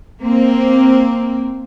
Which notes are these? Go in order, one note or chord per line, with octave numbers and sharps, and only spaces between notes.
A#3 C4